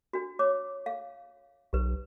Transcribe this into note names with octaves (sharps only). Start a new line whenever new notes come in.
D4 F#4
C#5 D6
F5
B1 G4 B4